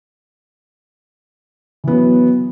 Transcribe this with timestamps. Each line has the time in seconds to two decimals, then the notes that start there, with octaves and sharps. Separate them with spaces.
1.84 E3
1.87 B3
1.91 F#3